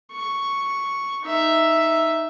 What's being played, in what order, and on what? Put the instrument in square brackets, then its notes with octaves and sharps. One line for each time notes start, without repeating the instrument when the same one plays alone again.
[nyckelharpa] C#6
D#4 E5